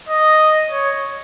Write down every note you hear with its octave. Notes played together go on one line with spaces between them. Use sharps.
D#5
C#5